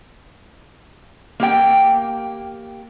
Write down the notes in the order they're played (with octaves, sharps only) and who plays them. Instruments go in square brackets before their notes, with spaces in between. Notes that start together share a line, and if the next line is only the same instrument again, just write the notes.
[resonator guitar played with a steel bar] A#3 G4 G5